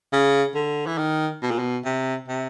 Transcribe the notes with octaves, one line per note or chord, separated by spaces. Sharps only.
C#3
D3
E3
D#3
B2
A#2
B2
C3
C3